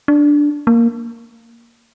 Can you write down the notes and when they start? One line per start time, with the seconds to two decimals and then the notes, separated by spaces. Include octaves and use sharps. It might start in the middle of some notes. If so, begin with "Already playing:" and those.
0.08 D4
0.67 A#3